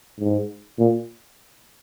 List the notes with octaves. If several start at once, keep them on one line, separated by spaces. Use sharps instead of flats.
G#2
A#2